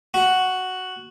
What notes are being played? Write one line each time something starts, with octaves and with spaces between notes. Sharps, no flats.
F#4